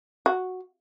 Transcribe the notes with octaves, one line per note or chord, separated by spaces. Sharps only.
F#4